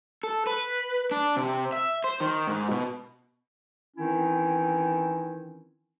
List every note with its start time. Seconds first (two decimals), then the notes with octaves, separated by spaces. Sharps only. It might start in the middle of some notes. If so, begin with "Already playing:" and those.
0.23 A4
0.47 B4
1.11 D4
1.37 C3
1.73 E5
2.04 C5
2.20 D#3
2.48 G#2
2.71 B2
3.97 D#3 E3 C4 C#4 D#4 E4